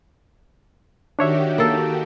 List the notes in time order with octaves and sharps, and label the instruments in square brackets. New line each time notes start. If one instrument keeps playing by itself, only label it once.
[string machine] D#3 F#4 G4 [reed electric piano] D4 C#5 E5
[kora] A#3 A4